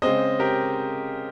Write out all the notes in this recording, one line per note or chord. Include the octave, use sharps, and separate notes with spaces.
C#3 G#3 C4 C5 D#5
G4 A#4